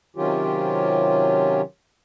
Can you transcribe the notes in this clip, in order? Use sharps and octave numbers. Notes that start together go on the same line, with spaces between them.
C3 D#3 F#3 C#4 F4 G4